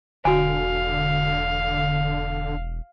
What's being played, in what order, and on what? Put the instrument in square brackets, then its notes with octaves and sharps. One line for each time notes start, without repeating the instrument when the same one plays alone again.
[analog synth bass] E1 [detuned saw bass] D3 [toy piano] F#4 G#5 [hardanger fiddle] F5